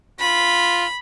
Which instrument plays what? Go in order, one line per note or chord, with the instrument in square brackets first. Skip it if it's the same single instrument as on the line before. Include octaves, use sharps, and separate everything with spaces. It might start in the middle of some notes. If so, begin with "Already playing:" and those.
[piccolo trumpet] F4 [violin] B5